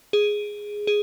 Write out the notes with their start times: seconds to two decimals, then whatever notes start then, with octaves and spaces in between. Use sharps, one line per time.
0.13 G#4
0.87 G#4